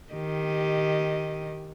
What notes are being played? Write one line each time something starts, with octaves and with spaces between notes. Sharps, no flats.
D#3 G4 D#5